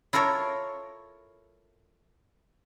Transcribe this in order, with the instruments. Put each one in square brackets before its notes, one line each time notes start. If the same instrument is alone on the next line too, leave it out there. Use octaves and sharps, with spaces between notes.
[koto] E4 F4 A4 A#4 C#5